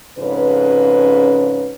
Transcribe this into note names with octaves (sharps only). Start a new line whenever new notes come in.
F2 G#2 C#3 C#4 B4